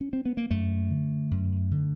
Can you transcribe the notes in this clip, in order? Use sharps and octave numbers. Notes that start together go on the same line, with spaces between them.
C#4
C4
B3
A#3
F#2 A3
D3
F#2
D3